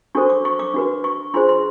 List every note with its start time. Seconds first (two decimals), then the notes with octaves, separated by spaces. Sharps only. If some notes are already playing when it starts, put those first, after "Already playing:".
0.15 D4 F#4 A4 C5 C#6
0.29 D6
0.45 C#6
0.59 D6
0.74 D4 F#4 B4
1.04 C#6
1.34 D4 F4 G#4 C5 C6
1.49 C6